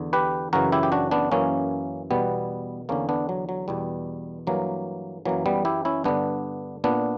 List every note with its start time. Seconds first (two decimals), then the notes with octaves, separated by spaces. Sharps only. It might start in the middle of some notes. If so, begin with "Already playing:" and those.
Already playing: E2 D3
0.13 G4 B4
0.53 F#2 C#3 E3 F#4 A#4
0.72 E4 G4
0.83 G4
0.92 D4 F#4
1.11 B3 D4
1.31 F#2 E3 A#3 C#4
2.11 E2 B2 G3 B3
2.89 E2 D3 A#3 C#4
3.09 B3 D4
3.29 F#3
3.49 F#3
3.68 E2 B2 G3
4.47 G2 E3 F#3 A#3
5.25 F#2 E3 F#3 A#3
5.46 G3 B3
5.65 E4 G4
5.85 C#4 E4
6.04 G2 D3 B3 D4
6.84 A#2 B3 D4